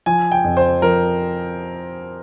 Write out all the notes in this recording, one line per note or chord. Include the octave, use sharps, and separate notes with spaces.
F3 G#5
G5
F2
C5
F3 A#4